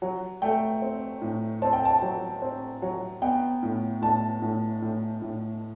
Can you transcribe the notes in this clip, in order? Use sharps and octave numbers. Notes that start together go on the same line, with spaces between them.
F#3
A3 G5
C4
A2
C4 A5
G5
A5
F#3
C4
F#3
B3 G5
A2
A2 A5
A2
A2
A2